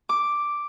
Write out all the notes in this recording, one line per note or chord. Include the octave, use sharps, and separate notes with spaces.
D6